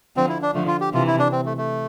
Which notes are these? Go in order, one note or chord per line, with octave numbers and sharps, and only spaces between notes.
D3 F3 C4
E4
D4
D3 F3 A3
F4
G4
C3 E3 F4
E4
D4
C4
A3
A3